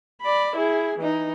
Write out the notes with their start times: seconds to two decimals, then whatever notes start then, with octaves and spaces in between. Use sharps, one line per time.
0.22 D5 B5
0.56 E4 G#4
0.98 E3 D#4